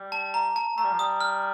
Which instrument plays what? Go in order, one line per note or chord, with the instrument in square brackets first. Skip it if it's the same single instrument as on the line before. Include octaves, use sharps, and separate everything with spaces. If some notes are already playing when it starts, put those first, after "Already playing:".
Already playing: [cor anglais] G3
[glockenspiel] A5
A#5
A5
[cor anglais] A3 [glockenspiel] A#5
[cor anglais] G3
F3
[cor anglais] G3 [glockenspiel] D#6
[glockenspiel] F6